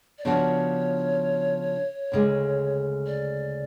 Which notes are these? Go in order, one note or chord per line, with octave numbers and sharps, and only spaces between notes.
D5
C#3 F3 B3 D4 F#4 C#5
D2 C#3 G#3
D5